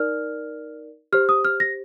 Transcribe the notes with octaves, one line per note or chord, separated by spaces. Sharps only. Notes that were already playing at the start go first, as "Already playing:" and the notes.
Already playing: D#4 A#4 D5 F6
G4 C5 F6
D#6
F6
A#6